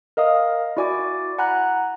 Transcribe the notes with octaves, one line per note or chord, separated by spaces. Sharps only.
A#4 D#5 F5 D#6
E4 F#4 D5 G#5 D6
F#5 G#5 A#5 B5 F#6